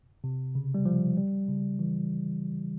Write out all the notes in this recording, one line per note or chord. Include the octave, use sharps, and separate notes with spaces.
C3
C#3
G3
F3
G3
C#3
E3